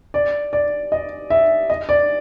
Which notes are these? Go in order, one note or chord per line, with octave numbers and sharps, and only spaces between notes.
D5
D5
D#5
E5
D#5
D5